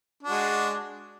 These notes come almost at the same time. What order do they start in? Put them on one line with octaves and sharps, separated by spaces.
D4 F#4 G#3